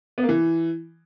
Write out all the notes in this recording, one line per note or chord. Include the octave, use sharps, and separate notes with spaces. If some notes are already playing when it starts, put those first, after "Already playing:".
B3
A#3
E3